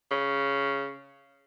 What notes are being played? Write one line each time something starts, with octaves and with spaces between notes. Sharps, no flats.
C#3